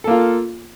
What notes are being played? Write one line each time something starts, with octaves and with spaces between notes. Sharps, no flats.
A#3 F4 A4